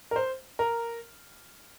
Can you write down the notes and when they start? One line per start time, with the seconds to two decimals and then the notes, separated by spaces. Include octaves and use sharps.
0.11 A#4
0.16 C5
0.59 A#4